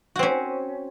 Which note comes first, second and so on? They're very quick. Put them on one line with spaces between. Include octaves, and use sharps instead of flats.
F#4 C4 C#4